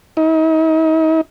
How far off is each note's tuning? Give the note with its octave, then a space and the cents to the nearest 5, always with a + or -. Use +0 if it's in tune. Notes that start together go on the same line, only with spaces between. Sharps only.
D#4 +45